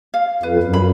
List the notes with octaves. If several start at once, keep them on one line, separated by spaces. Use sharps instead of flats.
F5
F2 B4
F#2
B5